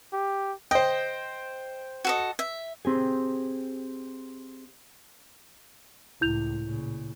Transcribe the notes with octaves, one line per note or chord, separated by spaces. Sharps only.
G4
C5 D#5 G5
F#4 A4 D#5
E5
C4 G4 G#4
C#2 A2 E4 G6 F7
A#2 C#3